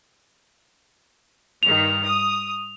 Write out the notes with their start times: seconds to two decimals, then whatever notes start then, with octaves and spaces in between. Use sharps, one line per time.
1.63 G2 D#3 F7
2.05 D#6